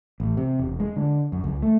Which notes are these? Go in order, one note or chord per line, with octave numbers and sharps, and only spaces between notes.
A1
C3
E1
G#3
D3
F#2
C#2
A3